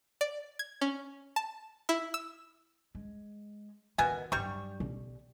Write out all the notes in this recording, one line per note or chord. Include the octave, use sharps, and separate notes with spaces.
D5
G#6
C#4
A5
E4
E6
G#3
B2 D#3 G#5
G2 F#3 G3 C#6
B1